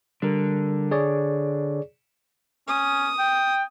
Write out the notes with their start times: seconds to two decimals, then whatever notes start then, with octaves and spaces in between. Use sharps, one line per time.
0.22 D3 G3 A#4
0.91 G#4 C#5 D5
2.68 C#4 D#6
3.19 G5